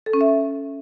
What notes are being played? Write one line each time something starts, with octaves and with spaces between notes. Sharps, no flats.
A4
C#4
E5